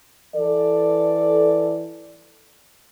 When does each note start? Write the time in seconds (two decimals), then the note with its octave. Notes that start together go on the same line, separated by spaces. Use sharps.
0.36 E3 A4 D5